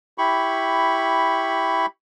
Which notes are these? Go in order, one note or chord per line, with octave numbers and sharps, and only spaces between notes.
E4 G4 B5 C#6